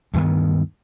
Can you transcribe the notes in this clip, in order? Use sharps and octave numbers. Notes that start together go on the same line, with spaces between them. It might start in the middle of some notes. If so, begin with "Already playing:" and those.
D2 G2 D#3 B3